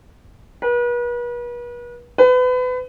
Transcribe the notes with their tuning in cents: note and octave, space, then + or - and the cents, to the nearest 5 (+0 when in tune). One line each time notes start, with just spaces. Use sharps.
B4 -40
B4 +30